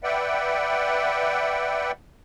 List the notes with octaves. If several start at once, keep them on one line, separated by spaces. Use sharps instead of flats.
B4 D5 E5 F#5 G5